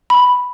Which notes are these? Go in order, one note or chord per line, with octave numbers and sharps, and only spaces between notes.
B5